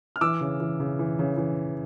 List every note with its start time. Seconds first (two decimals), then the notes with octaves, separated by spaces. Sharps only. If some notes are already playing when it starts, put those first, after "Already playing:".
0.16 F6
0.21 E3 D6 E6
0.41 C#3
0.60 E3
0.80 C#3
0.99 E3
1.19 C#3
1.37 E3